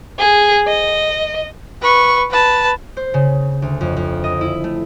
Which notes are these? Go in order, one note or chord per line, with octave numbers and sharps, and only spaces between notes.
G#4
D#5
B4 C#6
B4 A5
C5
C#3
D2
F2
F2
D#5
E4
A3